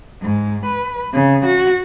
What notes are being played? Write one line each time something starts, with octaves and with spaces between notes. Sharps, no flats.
G#2
B4
C#3
F#4